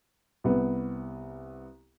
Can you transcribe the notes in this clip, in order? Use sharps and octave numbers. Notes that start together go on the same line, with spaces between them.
C2 B3